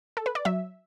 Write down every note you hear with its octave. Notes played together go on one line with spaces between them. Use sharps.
A4
B4
D5
F#3 E5